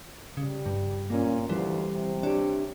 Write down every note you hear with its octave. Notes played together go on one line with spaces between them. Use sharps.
C#3 G3
G2
A#2 A#3 C#4
D2 E3 G3 C5
C3
D4 G4 C#5